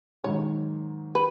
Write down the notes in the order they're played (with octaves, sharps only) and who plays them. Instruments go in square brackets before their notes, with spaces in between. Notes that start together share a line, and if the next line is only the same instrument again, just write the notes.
[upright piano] G#2 D#3 F#3 [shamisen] C#5
[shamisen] B4